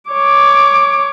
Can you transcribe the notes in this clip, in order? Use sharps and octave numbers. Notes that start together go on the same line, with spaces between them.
C#5 D6